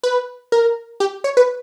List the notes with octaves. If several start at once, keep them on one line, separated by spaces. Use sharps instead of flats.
B4
A#4
G4
C#5
B4